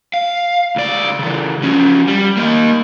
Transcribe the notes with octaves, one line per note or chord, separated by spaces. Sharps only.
F5
C#2 D5
C#3 E3
F3 C#4
G3
A#3 D#5